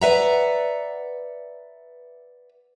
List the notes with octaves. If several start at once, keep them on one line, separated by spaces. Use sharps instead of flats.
B4 D5 E5 F#5 A#5